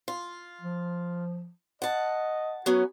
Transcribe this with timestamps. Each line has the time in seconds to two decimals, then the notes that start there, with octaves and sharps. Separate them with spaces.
0.08 F4
0.61 F3
1.82 D#5 F#5 A5
2.66 F#3 B3 C#4 F#4